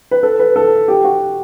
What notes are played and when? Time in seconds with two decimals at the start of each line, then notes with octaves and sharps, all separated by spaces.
0.11 B4
0.23 A4
0.39 B4
0.56 A4
0.88 G4
1.04 F#4